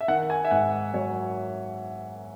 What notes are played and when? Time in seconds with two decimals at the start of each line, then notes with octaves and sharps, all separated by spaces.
0.01 E5
0.08 D#3 F#5
0.30 G#5
0.44 E5
0.51 G#2 F#5
0.94 F#3 C#5